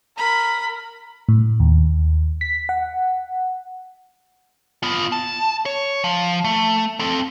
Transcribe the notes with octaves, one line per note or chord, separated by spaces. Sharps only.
A#4 B5
A2
D#2
B6
F#5
B3 F4
A5
C#5
F3
A3
C4 A4